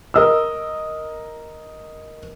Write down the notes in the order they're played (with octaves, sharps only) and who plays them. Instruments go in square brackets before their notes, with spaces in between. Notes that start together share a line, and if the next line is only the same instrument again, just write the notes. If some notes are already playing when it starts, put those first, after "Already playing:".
[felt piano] A#4 D#5 E6